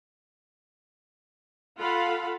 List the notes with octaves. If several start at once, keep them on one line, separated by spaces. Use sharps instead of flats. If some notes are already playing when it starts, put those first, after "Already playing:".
F4 A4 F5 F#5 B5